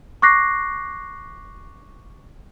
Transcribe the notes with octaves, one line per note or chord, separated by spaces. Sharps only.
C#6 D6 F#6 A#6 C7